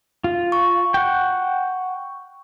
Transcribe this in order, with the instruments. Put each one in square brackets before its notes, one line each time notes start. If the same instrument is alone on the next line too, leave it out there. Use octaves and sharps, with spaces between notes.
[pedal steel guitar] F4
[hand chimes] C#6
[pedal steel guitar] F#5 G5